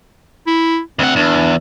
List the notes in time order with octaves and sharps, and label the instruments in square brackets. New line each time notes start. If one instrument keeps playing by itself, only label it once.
[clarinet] E4
[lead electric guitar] D2 F#5 [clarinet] C4
[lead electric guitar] E2 [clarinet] D4